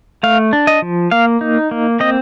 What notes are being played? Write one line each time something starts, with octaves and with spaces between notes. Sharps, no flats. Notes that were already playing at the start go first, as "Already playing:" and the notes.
A3 F5
D4
D#5
F3
A#3 F5
D#4
A#3
C4 D#5